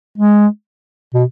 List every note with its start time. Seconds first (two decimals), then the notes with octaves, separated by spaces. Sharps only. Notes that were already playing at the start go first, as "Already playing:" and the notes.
0.18 G#3
1.14 B2